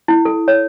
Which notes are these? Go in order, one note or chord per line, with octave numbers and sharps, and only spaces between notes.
E4
A4
C#5